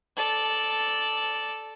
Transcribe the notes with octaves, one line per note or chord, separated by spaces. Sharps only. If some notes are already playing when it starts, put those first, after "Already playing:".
A4 D5